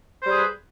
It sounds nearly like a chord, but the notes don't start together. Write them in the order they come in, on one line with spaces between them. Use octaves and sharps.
C5 G3 G#4 B4